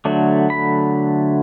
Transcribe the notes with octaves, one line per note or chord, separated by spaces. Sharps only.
D3 F#3 A3
B5